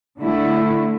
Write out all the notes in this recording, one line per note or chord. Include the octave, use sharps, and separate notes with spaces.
D3 A3 E4